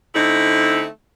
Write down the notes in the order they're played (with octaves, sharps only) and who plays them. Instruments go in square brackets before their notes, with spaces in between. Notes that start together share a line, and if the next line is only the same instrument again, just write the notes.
[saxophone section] D3 A3 C4 D#4 E4